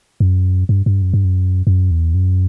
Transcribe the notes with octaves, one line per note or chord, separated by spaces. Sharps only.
F#2
G2
G2
F#2
G2
F#2
F#2
E2
F#2